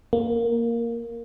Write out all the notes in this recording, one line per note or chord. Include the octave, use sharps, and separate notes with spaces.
A#3